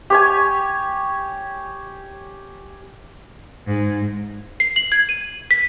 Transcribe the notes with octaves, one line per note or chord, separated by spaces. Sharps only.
G4 C#5 G#5
G#2
C7
F#7
G#6
D#7
B6